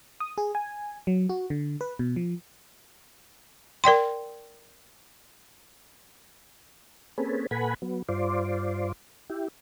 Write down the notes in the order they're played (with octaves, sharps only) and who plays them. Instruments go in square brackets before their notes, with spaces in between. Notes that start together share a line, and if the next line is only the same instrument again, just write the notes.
[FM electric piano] D#6
G#4
G#5
F#3
F#4
D3
B4
B2
F3
[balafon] A#4 D5 G5 C6
[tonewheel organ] A#3 C4 C#4 G#4 A4 B4
A#2 A4 B4 F#5 G#5 B5
F#3 B3
G2 F4 C5 D5
E4 G4